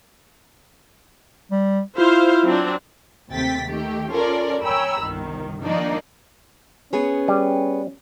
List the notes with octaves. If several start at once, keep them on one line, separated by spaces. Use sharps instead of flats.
G3
E4 F4 C5 F5
F#3 C4 D4
D#2 C3 A3 G5 A6 B6
D#3 A3 G4
C#4 F4 A4 A#4 D5
C#5 G5 G#5 A#5 B5 E6
G1 C2 D#3
D#3 F3 A#3 D4 D#4 D5
B3 C#4 G#4 C#5
G3